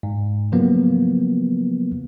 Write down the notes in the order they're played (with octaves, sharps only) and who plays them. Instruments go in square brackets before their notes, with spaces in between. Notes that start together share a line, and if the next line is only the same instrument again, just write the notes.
[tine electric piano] G#2
C#3 F3 F#3 A#3 B3